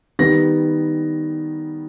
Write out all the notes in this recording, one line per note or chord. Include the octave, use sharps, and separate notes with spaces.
D#3 G3 B3 A#6